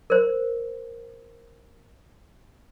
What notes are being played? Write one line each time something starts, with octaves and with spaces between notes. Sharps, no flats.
A#4 C5